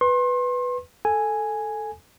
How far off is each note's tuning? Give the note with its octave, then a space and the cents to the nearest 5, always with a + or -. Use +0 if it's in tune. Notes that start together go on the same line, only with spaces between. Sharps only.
B4 +0 C6 +35
A4 +0 G#5 +0